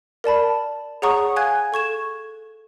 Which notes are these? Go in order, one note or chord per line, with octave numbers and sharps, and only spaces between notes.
A#4 D5 A5 B5
G#4 C#5 F#5 A#5 C#6 D#6
F5 G#5 F#6 G#6
A4 C#6 G#6 E7